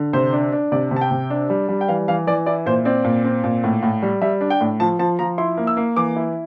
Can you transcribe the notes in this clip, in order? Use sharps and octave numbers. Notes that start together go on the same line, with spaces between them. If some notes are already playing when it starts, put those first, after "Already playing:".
Already playing: D3
C3 C5
D4
D4
C3 D5
C3
A5
G5
C3
D4
G3
G3
G5
E3 F5
E3 F5
E3 D5
E4 D5
A#2 C5
C4 D5
A#2
C4
A#2
A2
A2
G3
G3 E5
D4
G5
A2
F3 A5
F3 A5
F3 A#5
E4 C6
A#3
E6
A#3
E3 D6
E4